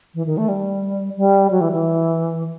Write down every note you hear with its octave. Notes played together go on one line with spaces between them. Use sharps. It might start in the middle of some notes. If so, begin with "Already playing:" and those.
E3
D#3
A3
G3
G3
F#3
E3
E3